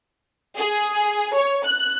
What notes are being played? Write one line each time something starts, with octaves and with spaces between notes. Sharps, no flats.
G#4
C#5
F#6